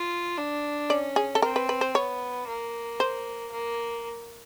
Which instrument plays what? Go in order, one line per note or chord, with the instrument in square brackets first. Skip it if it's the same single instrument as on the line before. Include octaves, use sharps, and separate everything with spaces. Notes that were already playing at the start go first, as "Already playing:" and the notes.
Already playing: [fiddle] F4
D4
[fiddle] C#4 [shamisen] D5
[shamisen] G#4
A4
[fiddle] C4 [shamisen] A#4
[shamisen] B4
B4
C5
[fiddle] B3 [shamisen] C#5
[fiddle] A#3
[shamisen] C5
[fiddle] A#3